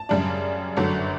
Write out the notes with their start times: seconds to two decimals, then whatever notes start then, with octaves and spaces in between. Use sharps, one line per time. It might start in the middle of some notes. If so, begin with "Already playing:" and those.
Already playing: A5
0.09 F#2 C#3 G3 D4
0.77 G1 F#2 D3 F#3